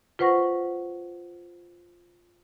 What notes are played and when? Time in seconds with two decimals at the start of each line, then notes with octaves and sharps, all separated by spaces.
0.19 F4 B4 C5 F#5 C#6 A#6